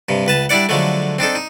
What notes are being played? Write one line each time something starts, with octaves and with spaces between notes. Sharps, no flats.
G2 C3
C#2 B4 A5
G3 D4 E4 D5 F#5
D3 F3 F#3 G#3 A3
C4 D4 D#4 A4
D#4